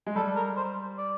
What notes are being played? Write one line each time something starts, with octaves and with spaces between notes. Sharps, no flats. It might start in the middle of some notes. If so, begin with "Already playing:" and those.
G#3
G3 A4
A#4
C5
D5